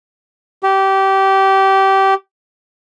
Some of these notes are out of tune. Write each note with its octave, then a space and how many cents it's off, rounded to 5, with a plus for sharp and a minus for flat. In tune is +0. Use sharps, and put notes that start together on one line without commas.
G4 -20